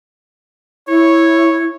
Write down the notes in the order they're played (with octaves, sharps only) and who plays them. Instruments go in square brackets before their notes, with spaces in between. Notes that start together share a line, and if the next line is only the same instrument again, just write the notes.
[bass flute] E4 [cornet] C#5